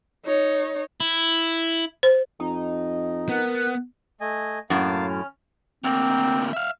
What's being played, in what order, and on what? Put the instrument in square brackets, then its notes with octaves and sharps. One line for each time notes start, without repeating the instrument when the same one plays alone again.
[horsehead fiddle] D#4 C#5
[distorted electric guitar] E4
[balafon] C5
[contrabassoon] F2 [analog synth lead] D#4
[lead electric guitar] B3 [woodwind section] A#4 F#5
[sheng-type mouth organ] A3 D#5 G#5
[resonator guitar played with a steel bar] F#2 A2 [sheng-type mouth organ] A#3 F5 A5
[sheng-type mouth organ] C#4 F6
[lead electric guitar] D2 A#3 [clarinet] C4
[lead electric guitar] E5 F5